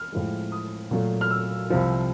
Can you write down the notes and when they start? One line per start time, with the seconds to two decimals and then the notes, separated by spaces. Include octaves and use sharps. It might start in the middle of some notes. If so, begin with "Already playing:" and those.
Already playing: F6
0.13 A2 F3 G#3
0.52 D#6
0.91 A#2 F#3 A3
1.21 F6
1.31 E6
1.70 C2 C3 F3